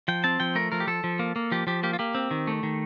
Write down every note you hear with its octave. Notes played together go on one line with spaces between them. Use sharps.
F3 G5
C4 A5
F3 G5
A3 A#4
F3 A#4
G4
F3 A4
F3
A#3
A#3
F3 G4
F3 G4
A#3 G4
F4
A#3 G4
C4
D#3
A3
D#3